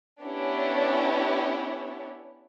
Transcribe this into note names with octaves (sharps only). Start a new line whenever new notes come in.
B3 C#4 D4 E4 G4 C#5